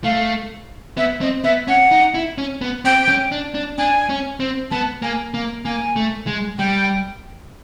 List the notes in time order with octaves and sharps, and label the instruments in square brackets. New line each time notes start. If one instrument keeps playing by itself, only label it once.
[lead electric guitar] A3 [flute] F5
[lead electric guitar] B3 [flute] E5
[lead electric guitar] C4 [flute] D#5
[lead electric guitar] B3 [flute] E5
[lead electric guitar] C#4 [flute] F#5
[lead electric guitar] D#4
E4
C#4
B3
[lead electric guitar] C4 [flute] G5
[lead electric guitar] C#4
D4
D4
[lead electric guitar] D4 [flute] G#5
[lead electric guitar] C#4
C4
[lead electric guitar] B3 [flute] A5
[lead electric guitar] A#3 [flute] G#5
[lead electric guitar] A#3
[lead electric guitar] A#3 [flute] G#5
[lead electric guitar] A3
G#3
[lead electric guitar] G3 [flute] G5